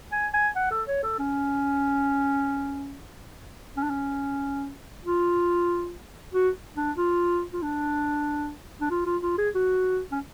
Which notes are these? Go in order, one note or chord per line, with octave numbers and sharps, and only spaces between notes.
G#5
G#5
F#5
A4
C#5
A4
C#4
C#4
D4
C#4
F4
F#4
D4
F4
F4
D4
D4
F4
F4
F4
G#4
F#4
C#4